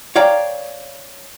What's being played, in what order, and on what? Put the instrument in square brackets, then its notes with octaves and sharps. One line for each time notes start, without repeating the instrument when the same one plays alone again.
[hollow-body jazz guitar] C#5 D5 F5 G5 A#5